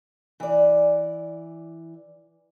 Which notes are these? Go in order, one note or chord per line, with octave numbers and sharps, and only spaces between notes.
E3 D5